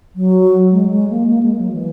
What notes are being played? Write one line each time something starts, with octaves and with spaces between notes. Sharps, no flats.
F#3
G#3
G#3
A#3
A#3
G#3
F#3
E3